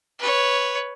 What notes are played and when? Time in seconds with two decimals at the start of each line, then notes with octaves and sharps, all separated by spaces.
0.19 B4 C#5